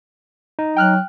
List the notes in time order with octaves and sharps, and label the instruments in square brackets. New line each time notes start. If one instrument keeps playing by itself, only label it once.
[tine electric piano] D#4
[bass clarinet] F#3 [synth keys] G5 F6 F#6